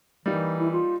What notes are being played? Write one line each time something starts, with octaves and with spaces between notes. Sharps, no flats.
E3 G3 A#3 D#4
E4
F4